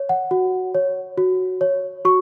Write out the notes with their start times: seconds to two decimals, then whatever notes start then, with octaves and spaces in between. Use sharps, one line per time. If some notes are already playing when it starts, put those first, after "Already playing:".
Already playing: C#5
0.09 F#5
0.31 F#4
0.74 C#5
1.18 F#4
1.61 C#5
2.05 F#4 C#6